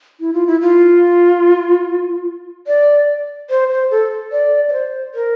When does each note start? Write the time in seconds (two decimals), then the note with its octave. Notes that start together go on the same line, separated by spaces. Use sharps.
0.20 E4
0.33 F4
0.47 E4
0.61 F4
2.67 D5
3.50 C5
3.70 C5
3.91 A4
4.32 D5
4.69 D5
4.73 C5
5.15 A#4